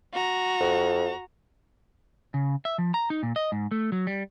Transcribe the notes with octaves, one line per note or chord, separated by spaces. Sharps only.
F#4 A#5
F2
C#3
E5
F3
A#5
D#4
A#2
D#5
G#2
A3
F#3
G3